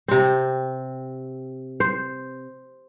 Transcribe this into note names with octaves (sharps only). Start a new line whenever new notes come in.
C3 C4
C5